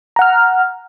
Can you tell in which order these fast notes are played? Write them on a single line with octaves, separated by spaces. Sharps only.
A#5 F#5 F6